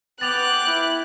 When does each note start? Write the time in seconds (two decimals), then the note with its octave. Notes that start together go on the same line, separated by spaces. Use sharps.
0.21 B3 G5 D6 F#6 A6 F7 F#7
0.68 E4